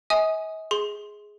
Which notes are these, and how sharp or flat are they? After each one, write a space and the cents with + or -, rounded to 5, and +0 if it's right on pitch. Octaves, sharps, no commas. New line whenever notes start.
D#5 +45 G#5 +0 D#6 +0
G#4 +0 C6 +0